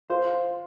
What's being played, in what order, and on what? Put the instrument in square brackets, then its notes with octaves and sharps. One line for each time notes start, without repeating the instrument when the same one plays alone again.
[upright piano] F4 [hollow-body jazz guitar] C5